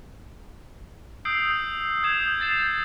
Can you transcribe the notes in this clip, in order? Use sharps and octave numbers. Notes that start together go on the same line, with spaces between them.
D#6 E6 G6 C7 D7
D#6 E6 G6 G#6 E7
G6 A6 C7 E7